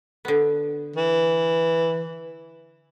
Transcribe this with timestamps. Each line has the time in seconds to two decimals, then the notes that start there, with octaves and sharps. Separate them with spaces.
0.25 D3 B3
0.96 E3